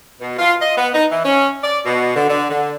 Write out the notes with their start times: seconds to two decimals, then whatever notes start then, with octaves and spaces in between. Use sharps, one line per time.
0.21 B2
0.39 F4
0.62 D#5
0.78 B3
0.95 D#4
1.12 E3
1.25 C#4
1.64 D5
1.86 B2
2.16 D3
2.29 D3
2.50 D3